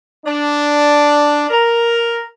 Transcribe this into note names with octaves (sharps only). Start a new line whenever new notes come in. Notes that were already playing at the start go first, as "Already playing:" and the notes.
D4
A#4